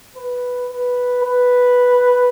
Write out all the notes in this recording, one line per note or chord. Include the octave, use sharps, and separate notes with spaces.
B4
B4
B4